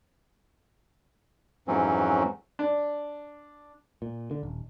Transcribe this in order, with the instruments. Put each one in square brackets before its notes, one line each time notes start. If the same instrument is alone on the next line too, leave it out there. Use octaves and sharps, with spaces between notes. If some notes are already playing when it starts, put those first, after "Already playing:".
[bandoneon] F2 G#2 E3 F#3 C4 C#4
[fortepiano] D4
[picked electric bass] A#2
D3
D#1